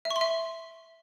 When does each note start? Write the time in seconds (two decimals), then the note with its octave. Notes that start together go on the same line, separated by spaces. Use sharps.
0.05 E5
0.11 C#6
0.16 C6
0.21 E5